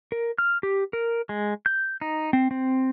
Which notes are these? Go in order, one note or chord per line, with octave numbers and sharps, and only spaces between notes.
A#4
F6
G4
A#4
G#3
G6
D#4
C4
C4